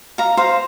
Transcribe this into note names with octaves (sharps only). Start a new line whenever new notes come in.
F5 A#5
C5 F5